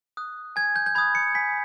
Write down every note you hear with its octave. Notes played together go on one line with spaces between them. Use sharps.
D#6 F#6
G#5 G#6
G6
G6
B5 D#6 F#6 G#6
C#7
G#5 B6